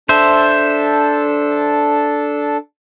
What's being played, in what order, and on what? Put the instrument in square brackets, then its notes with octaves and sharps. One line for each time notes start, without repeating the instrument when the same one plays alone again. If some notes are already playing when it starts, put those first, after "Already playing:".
[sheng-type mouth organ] D4 A4 [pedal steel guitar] C5 E5